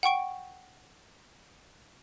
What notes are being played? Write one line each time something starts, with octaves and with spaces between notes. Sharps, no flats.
F#5 G5 C#6 D7